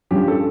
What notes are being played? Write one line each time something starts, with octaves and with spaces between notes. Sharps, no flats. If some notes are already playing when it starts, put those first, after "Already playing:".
G2 F3 C#4 G4
A4